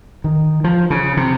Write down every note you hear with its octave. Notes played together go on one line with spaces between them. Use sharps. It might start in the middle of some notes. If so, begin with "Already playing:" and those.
D#3
F3
C#3
C3